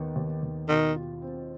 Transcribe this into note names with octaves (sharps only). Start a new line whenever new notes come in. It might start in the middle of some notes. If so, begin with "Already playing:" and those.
Already playing: D#2 D#3 B3
D#2
D#2
B2 D#3
F4
C4